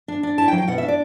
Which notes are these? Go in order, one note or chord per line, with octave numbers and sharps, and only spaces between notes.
D4
D4
E4 A5
G5
F#3
G5
B2 F#5
E5
D4
D5